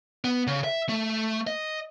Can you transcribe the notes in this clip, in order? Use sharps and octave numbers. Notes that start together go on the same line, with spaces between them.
B3
C#3
E5
A3
D#5